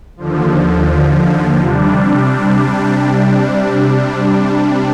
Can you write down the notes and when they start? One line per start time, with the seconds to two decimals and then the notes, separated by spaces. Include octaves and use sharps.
0.17 D#2 D3 F3
1.61 C3 G3 D4